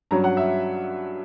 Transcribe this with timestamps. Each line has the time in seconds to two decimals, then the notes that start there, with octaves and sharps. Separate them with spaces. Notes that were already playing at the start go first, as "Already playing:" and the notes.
0.11 G2 F#3 C#4 A#5
0.24 F#5
0.37 E5